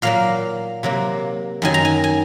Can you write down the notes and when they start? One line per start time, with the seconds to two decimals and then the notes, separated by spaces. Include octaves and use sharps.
0.02 A#2 F#3 A#3 F5
0.83 C3 F#3 A#3
1.62 F#2 D#3 F#3 G#5
1.74 A#5
1.85 G#5
2.04 G#5